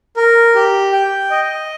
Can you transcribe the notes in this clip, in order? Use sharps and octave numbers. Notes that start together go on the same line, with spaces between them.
A#4
G4
G5
D#5